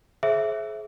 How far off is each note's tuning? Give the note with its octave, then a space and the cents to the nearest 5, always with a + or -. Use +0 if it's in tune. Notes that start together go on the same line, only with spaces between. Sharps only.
G#4 +40 C5 +35 E5 +5